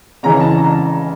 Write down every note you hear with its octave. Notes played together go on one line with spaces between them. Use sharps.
C#3 E3 G#3 C#4 A#5
A5
A#5